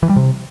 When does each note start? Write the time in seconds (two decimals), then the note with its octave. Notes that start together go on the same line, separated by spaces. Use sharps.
0.03 E3
0.09 G3
0.16 C3